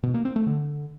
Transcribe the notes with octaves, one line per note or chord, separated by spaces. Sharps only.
B2
A#3
C4
A3
D3